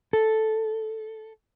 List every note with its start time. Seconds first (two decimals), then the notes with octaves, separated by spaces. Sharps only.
0.13 A4